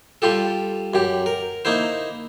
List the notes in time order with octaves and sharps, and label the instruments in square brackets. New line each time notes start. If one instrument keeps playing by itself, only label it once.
[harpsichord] G3 F4 G4 A4
F#2 G4
A#4
A#3 D#4 E4 C5